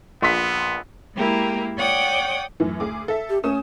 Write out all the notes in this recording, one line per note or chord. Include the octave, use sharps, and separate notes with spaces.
A#1 B3 C6 B6
G#3 A#3 E4 G4 A#4
C#5 D5 F#5 G5 D6 D#6
F#2 A2 E3
D2 G#4 D6
A4 E5
G4
A3 C#4 D#6 E7